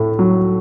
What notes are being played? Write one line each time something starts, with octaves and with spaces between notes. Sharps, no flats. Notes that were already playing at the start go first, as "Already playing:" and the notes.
Already playing: A2 A3
F#3